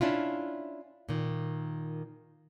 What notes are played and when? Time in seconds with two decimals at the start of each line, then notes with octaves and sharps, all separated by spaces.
0.01 C#4 D4 E4 F4
1.09 A#2 D#3